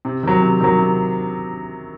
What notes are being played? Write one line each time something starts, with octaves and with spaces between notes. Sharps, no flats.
C3
D#3 F#3
C3
D#3 F#3
C3